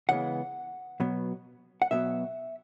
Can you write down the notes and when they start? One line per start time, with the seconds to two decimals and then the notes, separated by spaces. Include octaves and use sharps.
0.09 C#3 E3 G#3 B3 F#5
1.00 B2 F#3 B3
1.82 F#5
1.91 B2 F#3 B3 E5